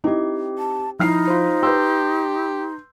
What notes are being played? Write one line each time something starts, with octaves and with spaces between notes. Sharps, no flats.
C4 D#4 E4 G4
A5
F3 D#4 E4 F6 C7
F4 C5
G4 B4 C6 E6 G6